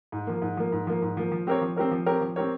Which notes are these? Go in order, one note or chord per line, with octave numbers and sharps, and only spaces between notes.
G#2
F3 A#3
G#2
F3 A#3
G#2
F3 A#3
G#2
F3 A#3
F3
C4 G4 A#4 C#5
F3
C4 G4 A#4 C#5
F3
C4 G4 A#4 C#5
F3
C4 G4 A#4 C#5